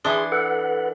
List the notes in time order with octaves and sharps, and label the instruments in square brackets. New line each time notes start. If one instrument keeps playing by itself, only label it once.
[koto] E3 D4 [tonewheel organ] G#4 C6
[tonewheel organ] A4 B4 F#5